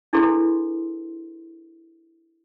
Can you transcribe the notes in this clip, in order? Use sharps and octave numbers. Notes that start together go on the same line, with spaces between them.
D4 E4 G#4 A4 B4 C6